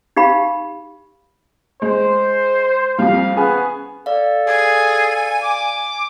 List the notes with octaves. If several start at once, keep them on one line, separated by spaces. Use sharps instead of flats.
D#4 G4 F5 B5
G#3 C5
F2 G3 F5
B3 C#4 G#4 G#5
A4 D5 F5
G#4 G#5
D6